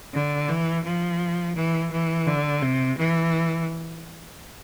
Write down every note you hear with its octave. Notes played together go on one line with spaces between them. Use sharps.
D3
E3
F3
E3
E3
D3
C3
E3